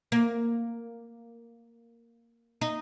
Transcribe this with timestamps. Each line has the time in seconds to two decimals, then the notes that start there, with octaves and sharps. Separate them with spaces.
0.12 A#3
2.61 D#4